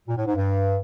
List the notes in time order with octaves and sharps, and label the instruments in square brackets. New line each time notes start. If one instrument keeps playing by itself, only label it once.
[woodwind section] A#2
A2
G#2
G2